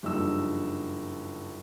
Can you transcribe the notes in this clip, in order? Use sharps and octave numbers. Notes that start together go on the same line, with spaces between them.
F#1 G2 F3 D#4 E6